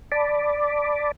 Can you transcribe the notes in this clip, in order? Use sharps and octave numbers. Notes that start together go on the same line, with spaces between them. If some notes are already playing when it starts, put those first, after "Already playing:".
D5 A5 B5 D6